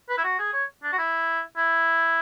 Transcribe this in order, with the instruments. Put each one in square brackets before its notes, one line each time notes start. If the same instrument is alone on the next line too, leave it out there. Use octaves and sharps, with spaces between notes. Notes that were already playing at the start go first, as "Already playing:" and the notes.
[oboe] B4
E4
F#4
G#4
C#5
D4
F#4
E4
E4